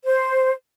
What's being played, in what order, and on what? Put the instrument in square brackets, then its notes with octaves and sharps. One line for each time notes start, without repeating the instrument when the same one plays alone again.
[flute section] C5